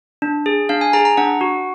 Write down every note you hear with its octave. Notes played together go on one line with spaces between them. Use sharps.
D4
G#4
D4 F5
G#5
G#4 A#5
A#5
D4 F#5
F#4